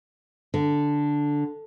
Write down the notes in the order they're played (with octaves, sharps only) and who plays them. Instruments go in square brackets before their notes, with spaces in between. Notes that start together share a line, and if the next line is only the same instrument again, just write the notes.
[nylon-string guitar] D3